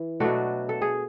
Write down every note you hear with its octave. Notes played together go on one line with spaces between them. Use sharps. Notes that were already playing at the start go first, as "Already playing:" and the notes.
Already playing: E3
B2 F#3 A3 D4 F#4
A4
G#4